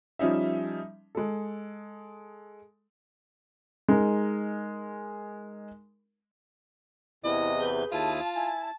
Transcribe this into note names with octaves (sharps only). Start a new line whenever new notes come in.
F3 G3 C#4 D#4 E5
G#3 A4
G#3 D#4 A#4
E2 C3 E3 E4 D#5
G#4 B4 G6
D#2 E4 F4 A5 D#6
E4 G#5